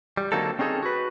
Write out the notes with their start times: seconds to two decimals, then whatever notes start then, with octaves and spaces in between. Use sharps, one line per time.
0.17 G3
0.32 D3 F#3 A#3 C4 D#4 A4
0.59 C4 C#4 D#4 G#4 A4
0.83 F#4 B4